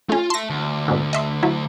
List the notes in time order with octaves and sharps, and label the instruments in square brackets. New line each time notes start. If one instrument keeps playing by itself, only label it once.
[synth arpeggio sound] A3 C#4 [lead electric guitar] F4
[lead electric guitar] E5 A5 [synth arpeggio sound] C6 A#6
[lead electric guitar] D2
[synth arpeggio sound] G#2 B2 D3
D#5 E5 C6
F#3 E4